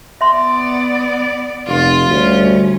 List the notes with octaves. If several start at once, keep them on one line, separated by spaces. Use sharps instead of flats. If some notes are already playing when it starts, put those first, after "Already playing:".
B3 D5 E5 C6
F1 F4
D2 G3 C#4